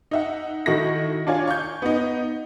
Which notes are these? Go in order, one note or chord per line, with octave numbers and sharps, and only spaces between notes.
D#4 E5 F#5
D#3 D#4 E4 F#4 A4 A#6
D4 F4 C#5 G#5
C#6 G6
B3 D#4